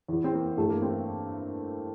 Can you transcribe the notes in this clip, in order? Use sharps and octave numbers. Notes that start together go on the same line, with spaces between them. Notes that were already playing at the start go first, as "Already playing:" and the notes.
E2 E3
C4
A#3
G2 E3 A3
A#3
C4